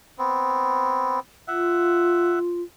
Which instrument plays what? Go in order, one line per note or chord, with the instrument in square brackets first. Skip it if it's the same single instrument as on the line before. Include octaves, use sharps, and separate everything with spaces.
[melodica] B3 C4
[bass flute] F4 [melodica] E5 F#5